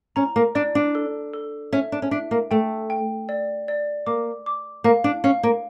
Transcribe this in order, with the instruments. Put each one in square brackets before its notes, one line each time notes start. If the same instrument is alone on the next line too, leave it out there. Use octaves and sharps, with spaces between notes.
[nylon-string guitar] C#4 [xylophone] A#5
[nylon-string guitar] A#3
[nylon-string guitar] D4 [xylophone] D5
[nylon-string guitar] D4
[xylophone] A4
A4
[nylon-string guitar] C#4 [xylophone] E5
[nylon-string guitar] D4
C#4
[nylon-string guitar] D4 [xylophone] E5
[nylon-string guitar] A#3
[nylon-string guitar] A3 [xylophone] G5
[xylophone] G5
D5
D5
[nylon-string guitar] A#3 [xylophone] D6
[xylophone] D6
[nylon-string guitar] A#3 [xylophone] F5
[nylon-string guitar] D4
[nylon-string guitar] C#4 [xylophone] F5
[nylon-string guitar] A#3